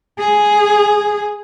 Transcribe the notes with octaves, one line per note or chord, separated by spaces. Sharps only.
G#4